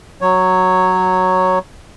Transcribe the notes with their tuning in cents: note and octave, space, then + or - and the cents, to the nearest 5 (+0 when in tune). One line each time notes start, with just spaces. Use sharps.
F#3 +0 C#5 +0